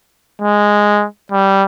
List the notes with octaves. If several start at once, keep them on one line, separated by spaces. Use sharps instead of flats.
G#3
G3